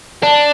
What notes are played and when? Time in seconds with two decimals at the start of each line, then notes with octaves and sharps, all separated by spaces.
0.23 D4